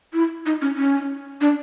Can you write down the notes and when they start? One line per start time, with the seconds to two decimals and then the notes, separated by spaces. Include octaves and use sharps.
0.13 E4
0.46 D#4
0.61 C#4
0.77 C#4
1.41 D4